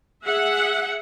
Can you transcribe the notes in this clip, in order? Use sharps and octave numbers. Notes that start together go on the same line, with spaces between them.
G#4 E5 F#5